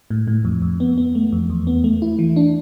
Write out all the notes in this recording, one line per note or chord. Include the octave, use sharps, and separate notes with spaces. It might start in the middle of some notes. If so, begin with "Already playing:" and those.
A2
A2
F2
F2
B3
B3
A3
F2
E2
B3
A3
E4
E3
D4